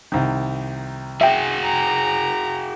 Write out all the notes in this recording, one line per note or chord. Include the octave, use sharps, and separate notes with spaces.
C2 D#3
F#4 G#4 E5 G5
A#5